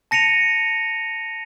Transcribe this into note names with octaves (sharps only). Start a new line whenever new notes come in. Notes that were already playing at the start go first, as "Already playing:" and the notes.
A5 A#6 C#7 D#7 F7